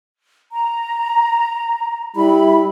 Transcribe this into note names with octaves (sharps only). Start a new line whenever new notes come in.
A#5
G3 E4 B5